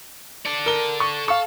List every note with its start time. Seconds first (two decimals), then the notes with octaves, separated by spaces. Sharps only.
0.45 A4 D5
0.66 A#4 G7
1.00 C#6
1.28 A4 F5 C#6